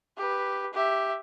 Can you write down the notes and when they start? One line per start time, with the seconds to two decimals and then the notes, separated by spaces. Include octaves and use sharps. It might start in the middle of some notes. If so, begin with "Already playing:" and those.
0.17 G4 B4
0.73 G4 E5